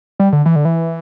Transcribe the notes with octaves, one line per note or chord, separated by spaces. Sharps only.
G3
D3
E3
D3
E3